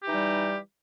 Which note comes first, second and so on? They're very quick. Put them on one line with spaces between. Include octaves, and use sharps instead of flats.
G4 E3 D#4 G3